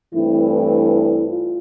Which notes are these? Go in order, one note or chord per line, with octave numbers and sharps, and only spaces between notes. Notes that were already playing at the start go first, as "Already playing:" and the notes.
G2 E3 A3 C4 E4
E4
E4
F4